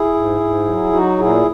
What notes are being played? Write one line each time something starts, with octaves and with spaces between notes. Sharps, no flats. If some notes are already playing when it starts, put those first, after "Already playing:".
Already playing: E4 G#4
G#2
G#2
F#3
F#3 D#4 F#4
A#2 E4 G#4